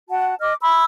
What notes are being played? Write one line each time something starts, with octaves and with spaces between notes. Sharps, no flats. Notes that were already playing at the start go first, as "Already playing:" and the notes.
F#4 F#5 A5
D#5 D6 F6
B5 C6 E6